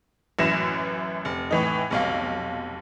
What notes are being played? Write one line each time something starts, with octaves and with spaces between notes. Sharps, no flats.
A1 F#2 E3 E4 A#6 E7
F1
A2 E3 D#4
F1 B1 F5